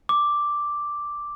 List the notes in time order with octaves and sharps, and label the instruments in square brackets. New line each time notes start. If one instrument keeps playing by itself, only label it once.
[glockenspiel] D6